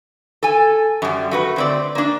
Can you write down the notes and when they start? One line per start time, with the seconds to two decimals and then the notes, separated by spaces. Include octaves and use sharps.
0.43 A4 G#5
1.02 F#2 G3
1.31 A3 F#4 B4
1.56 D3 C4 D5
1.95 A#3 D4